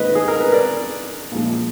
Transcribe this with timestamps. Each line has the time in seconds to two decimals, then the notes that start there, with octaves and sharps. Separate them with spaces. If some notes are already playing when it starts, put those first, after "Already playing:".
Already playing: G#2 D#3 A#3 B4 D#5
0.15 G#4
0.28 A#4
0.41 B4
0.52 A#4 D5
1.32 A#2 F3 G#3